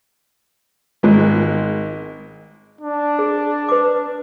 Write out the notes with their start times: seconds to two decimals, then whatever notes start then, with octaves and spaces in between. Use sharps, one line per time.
1.03 G#1 G#3
2.81 D4
3.19 G#4
3.69 B4 D6